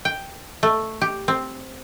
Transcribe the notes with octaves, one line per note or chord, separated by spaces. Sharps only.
G5
A3
G4
C4